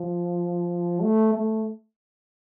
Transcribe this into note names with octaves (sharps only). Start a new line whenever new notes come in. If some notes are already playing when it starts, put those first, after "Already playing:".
Already playing: F3
A3
A3